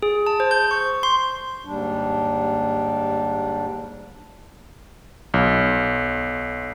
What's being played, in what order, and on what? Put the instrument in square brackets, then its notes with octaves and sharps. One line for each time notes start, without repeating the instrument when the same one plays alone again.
[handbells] G#4
A5
C5
G6
C#6
C6
[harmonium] D#2 G#2 G3 D4
[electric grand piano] B1